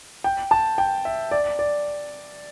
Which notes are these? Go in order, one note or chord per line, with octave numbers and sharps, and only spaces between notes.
G5
A5
G5
E5
D5
D5